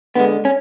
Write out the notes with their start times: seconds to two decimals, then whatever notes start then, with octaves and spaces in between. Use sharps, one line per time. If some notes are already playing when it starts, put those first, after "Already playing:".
0.15 D3 G#3 B3
0.45 C#4